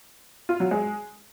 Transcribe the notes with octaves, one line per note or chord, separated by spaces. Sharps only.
F4
F#3
G#3